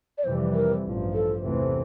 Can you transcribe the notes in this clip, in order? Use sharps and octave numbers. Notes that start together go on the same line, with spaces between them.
D5
F2 C3 E3 G3 C5
A#4
A1 G2 F3
A4
E2 C3 E3 A3 C4